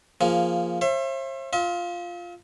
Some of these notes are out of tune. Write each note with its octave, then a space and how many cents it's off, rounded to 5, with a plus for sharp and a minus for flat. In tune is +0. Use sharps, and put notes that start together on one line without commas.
F3 -10 A#3 +0 G#4 +0
C5 +45 E5 +35
F4 +0 E5 -45